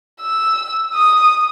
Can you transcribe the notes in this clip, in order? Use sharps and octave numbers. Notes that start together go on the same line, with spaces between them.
E6
D#6